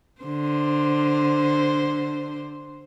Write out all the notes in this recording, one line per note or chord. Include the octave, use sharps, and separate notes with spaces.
D3 C5